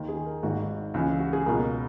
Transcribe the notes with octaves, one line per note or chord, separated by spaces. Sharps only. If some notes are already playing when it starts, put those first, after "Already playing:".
Already playing: D#2 D#3
G#4
A#4
G#1 G#2 D#3 F#4
C#2 C#3 E3
F#4
G#4
C#2 B2 A#4